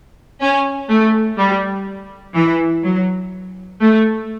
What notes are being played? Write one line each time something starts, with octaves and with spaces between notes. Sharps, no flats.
C#4
A3
G3
E3
F#3
A3